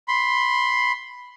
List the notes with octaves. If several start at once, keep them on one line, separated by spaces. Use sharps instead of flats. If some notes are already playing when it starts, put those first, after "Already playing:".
B5 C6